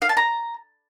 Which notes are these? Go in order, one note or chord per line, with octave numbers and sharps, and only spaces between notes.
F5
A5
A#5